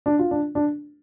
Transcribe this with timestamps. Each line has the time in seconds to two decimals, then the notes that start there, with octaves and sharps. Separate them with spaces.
0.06 D4
0.19 F4
0.31 D4
0.55 D4